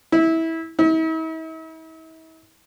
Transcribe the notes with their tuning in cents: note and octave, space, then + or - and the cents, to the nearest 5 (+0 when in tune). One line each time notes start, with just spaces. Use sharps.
E4 -20
E4 -45